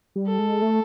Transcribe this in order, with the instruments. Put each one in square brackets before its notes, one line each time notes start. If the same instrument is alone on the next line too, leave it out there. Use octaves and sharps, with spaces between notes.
[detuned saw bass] G3
[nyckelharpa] A4
[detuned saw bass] G#3
A3